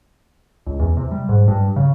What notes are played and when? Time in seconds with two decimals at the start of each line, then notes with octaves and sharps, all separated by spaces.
0.66 C#2
0.79 E2
0.97 C3
1.12 G3
1.29 G#2
1.48 G2
1.76 C#3